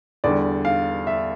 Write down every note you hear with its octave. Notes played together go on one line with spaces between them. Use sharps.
E2 D3 G3 D5
F5
E5